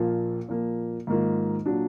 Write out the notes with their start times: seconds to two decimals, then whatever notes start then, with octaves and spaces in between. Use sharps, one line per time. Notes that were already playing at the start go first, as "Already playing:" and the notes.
Already playing: A#1 A#2 F3 A#3 F4
0.48 A#2 F3 A#3
1.07 G#2 D#3 A#3 F4
1.66 A#2 F#3 D4